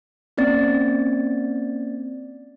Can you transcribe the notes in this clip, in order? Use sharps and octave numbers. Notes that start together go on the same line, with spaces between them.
A#3 C4 C#4 D5 A6